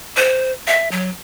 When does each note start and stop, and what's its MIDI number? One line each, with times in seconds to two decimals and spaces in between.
0.17 0.52 72
0.67 0.88 76
0.91 1.10 54